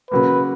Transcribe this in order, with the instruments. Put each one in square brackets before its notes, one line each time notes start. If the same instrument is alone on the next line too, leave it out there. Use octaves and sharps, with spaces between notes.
[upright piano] C#3 F#3 A#3 [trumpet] B4